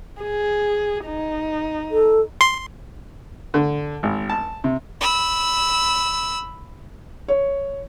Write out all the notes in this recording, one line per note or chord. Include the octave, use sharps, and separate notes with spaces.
G#4
D#4
A4
C6
D3
G#1
A5
C3
B5 E6
C#5